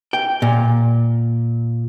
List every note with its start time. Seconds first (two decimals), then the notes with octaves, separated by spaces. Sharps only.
0.13 G5
0.42 A#2